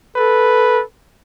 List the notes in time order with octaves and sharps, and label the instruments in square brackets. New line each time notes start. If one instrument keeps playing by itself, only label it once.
[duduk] A4 [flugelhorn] B4